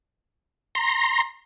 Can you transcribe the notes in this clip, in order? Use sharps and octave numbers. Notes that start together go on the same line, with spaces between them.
A#5 C6